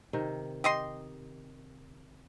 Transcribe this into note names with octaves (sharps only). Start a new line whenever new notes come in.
C3 D#3
G4 D#5 C6